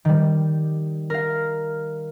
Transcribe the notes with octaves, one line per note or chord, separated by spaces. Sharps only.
D#3 G3
A#4 F5